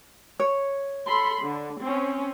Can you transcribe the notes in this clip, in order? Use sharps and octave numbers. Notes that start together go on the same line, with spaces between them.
C#5
A4 B5 C6
D3
C4 C#4